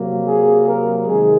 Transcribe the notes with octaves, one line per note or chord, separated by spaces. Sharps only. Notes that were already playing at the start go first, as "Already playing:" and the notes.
Already playing: C3 F#3 A#3
G#4
A#4
C3 D#3 G#3 G#4